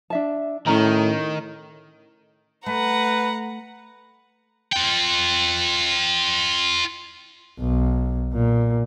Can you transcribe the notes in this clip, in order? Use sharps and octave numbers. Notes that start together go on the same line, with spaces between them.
D4 E5 A5
A2 D#3 C#4 A#5
A3 B4 F#5 A#5
F4 G5
B1
A#2